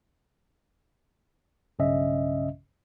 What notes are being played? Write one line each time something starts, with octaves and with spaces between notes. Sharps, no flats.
B1 G2 C#3 C#4 D#5 E5